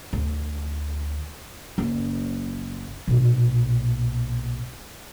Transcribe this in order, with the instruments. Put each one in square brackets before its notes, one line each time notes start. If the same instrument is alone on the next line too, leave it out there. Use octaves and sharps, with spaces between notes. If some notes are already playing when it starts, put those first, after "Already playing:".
[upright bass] D2
F#1
B1 A#2